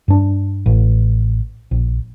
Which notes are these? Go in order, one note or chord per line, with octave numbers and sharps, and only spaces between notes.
G2 D4
A1
A#1